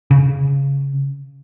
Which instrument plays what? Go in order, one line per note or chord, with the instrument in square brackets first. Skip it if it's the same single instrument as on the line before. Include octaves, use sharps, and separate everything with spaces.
[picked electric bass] C#3